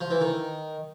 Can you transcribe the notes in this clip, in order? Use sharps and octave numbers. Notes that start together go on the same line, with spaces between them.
F3
E3
D#3